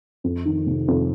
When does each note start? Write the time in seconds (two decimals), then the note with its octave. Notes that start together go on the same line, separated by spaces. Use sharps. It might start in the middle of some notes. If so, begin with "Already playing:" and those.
0.24 F2
0.45 D#3
0.67 C3
0.88 F2